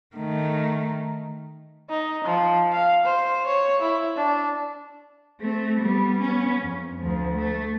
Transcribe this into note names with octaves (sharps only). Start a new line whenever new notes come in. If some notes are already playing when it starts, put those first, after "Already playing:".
D#3 A3
D#4
F3
F5
C5
C#5
E4
D4
A3 C4
G3 B3
B3 C#4
F2
D2 F3
A3